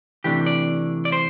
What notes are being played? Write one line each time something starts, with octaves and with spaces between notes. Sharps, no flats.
C3 E3 A3 D4 G4
D5
D5
C5